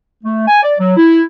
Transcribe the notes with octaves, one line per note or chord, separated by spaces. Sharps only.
A3
G#5
D5
F#3
E4